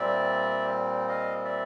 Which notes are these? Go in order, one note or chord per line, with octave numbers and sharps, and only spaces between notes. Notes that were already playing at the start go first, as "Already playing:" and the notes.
Already playing: A#2 G3 C4 D5 E5
D#5 F5
D5 E5